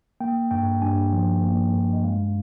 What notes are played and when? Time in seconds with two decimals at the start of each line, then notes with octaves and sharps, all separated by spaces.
0.20 A#3 G5
0.51 G2 G5
0.82 G2 G#5
1.12 F3
1.43 A#3
1.74 G2
1.93 D#5
2.04 G#3 F5